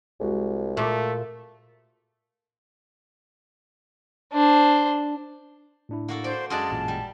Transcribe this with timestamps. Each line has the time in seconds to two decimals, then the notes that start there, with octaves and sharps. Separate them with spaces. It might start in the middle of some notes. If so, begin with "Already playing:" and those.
0.20 C2 G#3 F#4
0.77 A#2 A3
4.33 D4 C5
5.89 A2 D4 E4
6.08 A#3 F#4 A4
6.24 C5 D5
6.50 F#2 G#3 D5 A5 C6 D#6 F#6
6.70 A1 A#2
6.88 G3